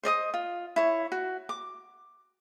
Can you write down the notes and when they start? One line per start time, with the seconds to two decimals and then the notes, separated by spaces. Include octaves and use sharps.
0.04 C5 D5 D#5 D#6
0.34 F4
0.76 E4 C#5
1.12 F#4
1.49 D6